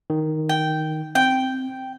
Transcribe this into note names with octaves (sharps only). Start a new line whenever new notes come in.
D#3
G5
C4 G5